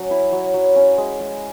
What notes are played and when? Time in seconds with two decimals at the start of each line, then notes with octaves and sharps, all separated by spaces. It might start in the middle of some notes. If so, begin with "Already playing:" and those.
Already playing: F#3 C#4
0.11 E4 E5
0.32 F#3
0.54 F#3
0.76 C#4
0.98 G#3
1.20 G#3